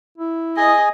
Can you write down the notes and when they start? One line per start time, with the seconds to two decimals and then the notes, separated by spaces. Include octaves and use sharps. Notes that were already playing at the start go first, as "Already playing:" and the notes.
0.18 E4
0.57 G#4 D#5 G#5